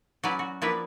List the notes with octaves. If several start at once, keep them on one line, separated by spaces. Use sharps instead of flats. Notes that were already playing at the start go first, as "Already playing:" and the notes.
F#3 C#4 E4 B4 D5
F#4
F3 A#3 D4 E4 B4 E5